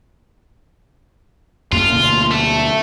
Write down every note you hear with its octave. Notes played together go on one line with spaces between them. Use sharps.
F#2 A#3 F4
D2 B2 A#3
A3